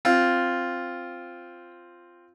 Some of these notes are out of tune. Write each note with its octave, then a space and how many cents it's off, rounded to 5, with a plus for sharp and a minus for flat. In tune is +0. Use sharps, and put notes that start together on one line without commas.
C4 +0 F4 +0